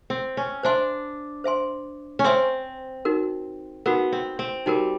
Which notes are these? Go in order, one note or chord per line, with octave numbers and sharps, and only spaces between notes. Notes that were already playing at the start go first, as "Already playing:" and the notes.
C4
C#4
D4 C5 E5 G#5 C6
C5 E5 G#5 C6
C#4
C4 C5 E5 G#5 C6
D#4 F#4 A#4
B3 D#4 F#4 A#4
C4
C4
G3 D#4 F#4 A#4